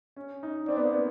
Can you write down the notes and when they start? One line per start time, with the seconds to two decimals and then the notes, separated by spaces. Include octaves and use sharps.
0.16 C#4
0.43 D#4
0.68 C4 D5
0.77 B3
0.85 A#3
0.93 B3